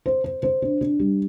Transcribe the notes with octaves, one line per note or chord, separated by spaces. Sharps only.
C5
C5
C5
D4
D4
G3